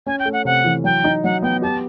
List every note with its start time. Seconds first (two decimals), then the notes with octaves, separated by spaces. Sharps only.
0.06 C#4 G#5
0.19 G5
0.25 A3
0.33 F#5
0.45 C3 F#5
0.65 E3
0.84 F#3 G5
1.04 D#4
1.24 F#3 F#5
1.42 B3 G5
1.62 G4 A5